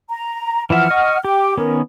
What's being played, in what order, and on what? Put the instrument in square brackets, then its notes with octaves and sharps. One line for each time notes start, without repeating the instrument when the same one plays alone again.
[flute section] A#5
[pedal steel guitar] E3 F3 E5 [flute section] F#5 F6
[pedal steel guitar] D#5 C#6
[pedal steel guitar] G4 [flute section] G5 D6
[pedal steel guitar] D#3 B3 C#4 [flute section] A#4